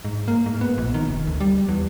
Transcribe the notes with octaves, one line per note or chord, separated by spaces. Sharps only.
G#2
A#3
G#2
B3
A#1
D#3
F1
D2
G3
E2